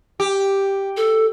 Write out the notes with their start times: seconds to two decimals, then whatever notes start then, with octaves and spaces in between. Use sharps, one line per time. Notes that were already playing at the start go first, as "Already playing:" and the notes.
0.20 G4
0.97 A4